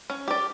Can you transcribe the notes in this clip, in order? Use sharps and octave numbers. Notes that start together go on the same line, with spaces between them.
C#4
G4 D5